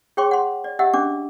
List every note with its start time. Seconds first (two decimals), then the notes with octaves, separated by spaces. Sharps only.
0.17 G#4 C#5 G5 C6 D6
0.31 F#5 C6
0.64 D5
0.79 G4 D#5 E5 F#5 E6
0.94 C#4 D4 D6